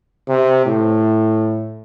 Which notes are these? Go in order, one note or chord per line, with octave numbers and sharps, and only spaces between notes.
C3
A2